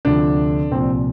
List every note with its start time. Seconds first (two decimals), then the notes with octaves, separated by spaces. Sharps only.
0.05 D2 C3 F3 D4
0.71 C2 A#2 F3 C4